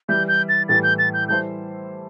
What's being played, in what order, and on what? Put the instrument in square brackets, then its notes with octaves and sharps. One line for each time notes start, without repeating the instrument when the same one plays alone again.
[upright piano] E3 G3 E4 [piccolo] G6
[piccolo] G6
A6
[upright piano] A2 E3 G3 [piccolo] A6
[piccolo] G6
A6
G6
[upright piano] E3 G3 E4 A4 C5 [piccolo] G6